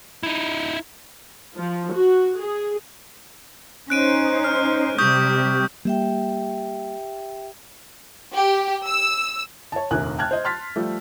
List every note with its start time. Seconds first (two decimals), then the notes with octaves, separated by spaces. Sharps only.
0.23 D#4 E4
1.57 F3
1.94 F#4
2.39 G#4
3.90 C#4 D#4 C5 F#6 D7 D#7
4.44 F6
4.99 C3 G3 G4 C#6 D#6 G6
5.85 G3 A#3 G4 E5 G5
8.36 G4
8.86 E6
9.72 C#5 A5
9.91 F1 A#1 D#2 A#4 G#5 F#6
10.18 G5 A5 F6 F#6 G#6
10.31 C5 D#5
10.44 A5 C6 F6 A6 B6
10.76 F3 G3 A3